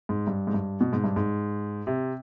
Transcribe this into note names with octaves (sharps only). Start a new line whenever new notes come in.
G#2
G2
G#2
G2
B2
G#2
G2
G#2
C3